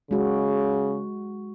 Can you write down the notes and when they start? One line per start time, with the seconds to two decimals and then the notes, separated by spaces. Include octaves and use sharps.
0.11 C#3 G#3 F#4